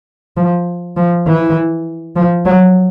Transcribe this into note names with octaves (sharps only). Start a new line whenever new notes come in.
F3
F3
E3
F3
F#3